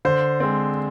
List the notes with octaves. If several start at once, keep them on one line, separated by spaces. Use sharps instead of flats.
D3 C5
G#3 C4